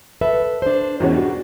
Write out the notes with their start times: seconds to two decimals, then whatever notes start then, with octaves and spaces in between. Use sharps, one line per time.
0.21 A4 B4 E5
0.62 D4 C5
1.00 E2 B2 C#4 F#4 A#4
1.13 G3 D4 F#4